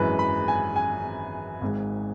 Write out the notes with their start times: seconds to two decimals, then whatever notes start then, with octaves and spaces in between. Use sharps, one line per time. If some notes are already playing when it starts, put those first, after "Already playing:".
Already playing: G#1 F#2 E3 G#3 B4
0.19 B5
0.48 G#5
0.76 G#5
1.61 G#1 G#2 G#3